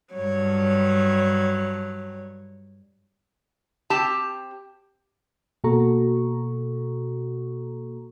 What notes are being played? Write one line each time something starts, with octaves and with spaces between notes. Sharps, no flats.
G2 F#3 C#5
C4 G4 A5
B2 A#3 F#4 A4 A#5 C#6